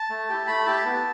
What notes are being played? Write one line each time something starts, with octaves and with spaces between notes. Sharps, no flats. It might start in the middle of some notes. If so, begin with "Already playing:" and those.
Already playing: A5
A3
E4 G4
A3 B5
E4 G4 A5
B3